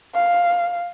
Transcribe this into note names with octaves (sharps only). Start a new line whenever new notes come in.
F5